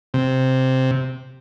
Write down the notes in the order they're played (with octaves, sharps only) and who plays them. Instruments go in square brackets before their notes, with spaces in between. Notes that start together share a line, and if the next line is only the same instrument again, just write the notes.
[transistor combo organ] C3